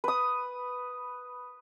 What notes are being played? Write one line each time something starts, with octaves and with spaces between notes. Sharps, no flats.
B4 D#6